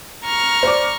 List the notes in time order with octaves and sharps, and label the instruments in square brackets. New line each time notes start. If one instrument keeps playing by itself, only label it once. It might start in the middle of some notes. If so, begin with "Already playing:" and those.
[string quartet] A#5 C#6 F6
[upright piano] C5 D5 D6